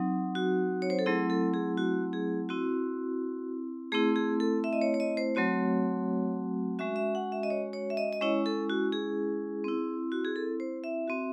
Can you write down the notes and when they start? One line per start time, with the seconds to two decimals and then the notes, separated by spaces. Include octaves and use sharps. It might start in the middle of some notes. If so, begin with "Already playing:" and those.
Already playing: F#3 C4 D#4
0.35 F#4
0.82 C#5
0.90 C5
0.99 A4
1.06 F#3 A3 C4 E4 G#4
1.30 A4
1.54 G#4
1.77 F#4
2.13 G#4
2.49 C4 E4 F#4
3.92 A3 C4 E4 G#4
4.16 G#4
4.40 A4
4.64 E5
4.73 D#5
4.81 C#5
4.94 C#5
5.00 D#5
5.17 C5
5.35 F#3 A3 C4 F#4 C#5
6.79 G#3 C#4 F#4 E5
6.96 E5
7.15 F#5
7.32 E5
7.43 D#5
7.50 C#5
7.73 C#5
7.90 E5
7.97 D#5
8.13 D#5
8.21 G#3 C#4 E4 C#5
8.46 A4
8.70 F#4
8.92 G#4
9.64 C4 E4
10.12 F#4
10.25 G#4
10.36 A4
10.60 C5
10.84 E5
11.08 C4 F#4